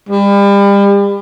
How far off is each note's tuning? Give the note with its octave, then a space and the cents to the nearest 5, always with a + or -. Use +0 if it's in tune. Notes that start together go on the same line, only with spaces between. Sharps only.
G3 +35